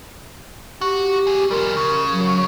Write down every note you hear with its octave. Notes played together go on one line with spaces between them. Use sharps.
F#4 G4
C4 G#4
F3 G3 A#4
C#3
F#3